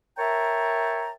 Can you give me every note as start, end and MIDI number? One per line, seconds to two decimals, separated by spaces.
0.18 1.11 70
0.18 1.11 73
0.18 1.11 76
0.18 1.11 79
0.18 1.11 81
0.18 1.11 82